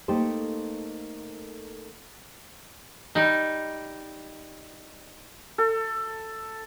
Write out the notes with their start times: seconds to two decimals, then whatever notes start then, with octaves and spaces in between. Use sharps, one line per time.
0.08 A3 A#3 D#4 G4 A4 C5
3.15 G3 D#4
5.58 A4